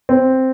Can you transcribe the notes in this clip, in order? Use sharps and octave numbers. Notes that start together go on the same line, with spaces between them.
C4